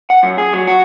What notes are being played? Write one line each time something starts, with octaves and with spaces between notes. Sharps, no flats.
F#5
F#2
G#4
F#3
F#4